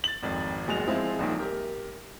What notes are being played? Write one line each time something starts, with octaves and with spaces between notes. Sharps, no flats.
A6 F#7
G#1 F2
F#1 E2 G#3 F#4 F7
F3 G#3 C4 E4
D#1 A#1 D#3
G4 A#4